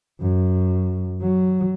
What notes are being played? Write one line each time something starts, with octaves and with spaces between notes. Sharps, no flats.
F#2
F#3